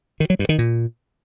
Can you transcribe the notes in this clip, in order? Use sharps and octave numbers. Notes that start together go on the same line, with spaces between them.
D#3
F#3
G2
D#3
A#2